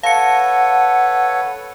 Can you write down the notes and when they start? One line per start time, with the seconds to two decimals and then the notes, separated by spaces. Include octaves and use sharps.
0.03 A4 B4 C#5 F5 F#5 A5 C#7